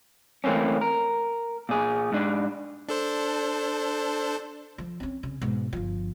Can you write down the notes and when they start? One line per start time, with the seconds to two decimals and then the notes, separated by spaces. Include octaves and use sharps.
0.44 E3 A3 A#3 C4 C#4
0.81 A#4
1.69 A#2 G#4
2.12 G#2 D4
2.89 D4 A4 C5
4.78 F3
5.00 C4 C#4
5.23 C#3
5.42 G#2 B2
5.73 G1 F3